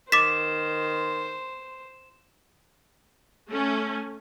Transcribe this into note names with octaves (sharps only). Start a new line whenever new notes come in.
D#3 C5 D6 A6 B6 E7
A3 C#4